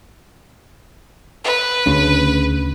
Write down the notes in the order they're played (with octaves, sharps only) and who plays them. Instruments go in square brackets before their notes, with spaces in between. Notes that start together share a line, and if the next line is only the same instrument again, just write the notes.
[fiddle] B4
[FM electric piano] D2 C#3